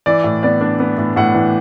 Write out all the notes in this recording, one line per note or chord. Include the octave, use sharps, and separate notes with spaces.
E3 D5
A2
B3 D5
D4
B3
A2
A2 F#5
E3